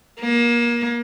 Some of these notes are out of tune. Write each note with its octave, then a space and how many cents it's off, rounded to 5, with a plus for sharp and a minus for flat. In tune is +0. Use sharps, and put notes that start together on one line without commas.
A#3 +30